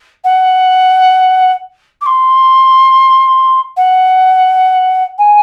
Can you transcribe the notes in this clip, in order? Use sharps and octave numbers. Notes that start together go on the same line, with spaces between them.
F#5
D6
C6
F#5
G#5